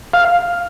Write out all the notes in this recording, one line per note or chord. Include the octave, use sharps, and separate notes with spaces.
F5